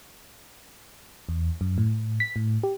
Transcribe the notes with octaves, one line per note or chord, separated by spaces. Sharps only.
E2
F#2
A2
B6
A2
G4